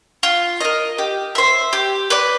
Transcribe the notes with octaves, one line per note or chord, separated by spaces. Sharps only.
F4
A#4 D#5
G4
C5 E5
G4
B4 D5